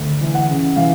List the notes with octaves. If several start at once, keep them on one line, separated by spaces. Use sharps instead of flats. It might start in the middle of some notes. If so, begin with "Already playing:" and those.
Already playing: D2
E3
F#5
C#3
E3 F5